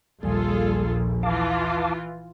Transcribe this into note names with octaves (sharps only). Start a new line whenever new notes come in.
A#1 D#2 F3 G3 F4 G#4 A4 G#5
E3 F4 F5 A5 D6